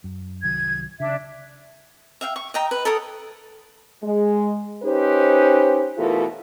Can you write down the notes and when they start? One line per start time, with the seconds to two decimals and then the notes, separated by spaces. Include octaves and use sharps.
0.04 F#2
0.43 C2 D#3 F#3 G#6
1.00 C#3 D4 E5
2.21 E5 F5 G5
2.36 C#6
2.54 D#5 G5 A#5
2.71 B4
2.85 A4 A#4 C#5 D#6
4.03 G#3
4.83 C#4 D#4 G4 B4 C5
5.98 B2 E3 A3 F4 A4 A#4